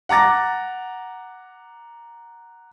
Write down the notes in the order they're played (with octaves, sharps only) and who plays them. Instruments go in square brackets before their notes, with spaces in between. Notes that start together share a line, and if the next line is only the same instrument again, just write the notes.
[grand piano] F#5 A#5 D6 A6 A#6